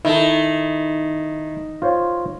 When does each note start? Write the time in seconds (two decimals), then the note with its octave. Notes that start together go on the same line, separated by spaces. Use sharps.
0.05 D#3 E4 A4
1.82 F4 C5 C#5